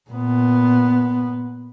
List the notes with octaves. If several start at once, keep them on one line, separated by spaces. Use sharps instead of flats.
A#2 B3